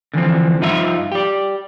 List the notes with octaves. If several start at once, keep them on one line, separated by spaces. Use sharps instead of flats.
D3 E3 F3 C4
G2 F3 D#4 F4 A#4 E5
G4 D5